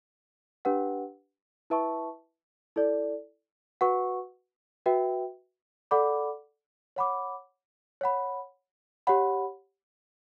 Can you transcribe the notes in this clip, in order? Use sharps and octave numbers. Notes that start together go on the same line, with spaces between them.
D4 G4 B4 F#5
E4 B4 E5 A5 C#6
E4 A4 D5
F#4 B4 F#5 C#6
F#4 B4 E5 G5
A4 D5 F#5 B5 D6
C#5 F#5 B5 D6
C#5 F#5 B5
G4 C#5 F#5 B5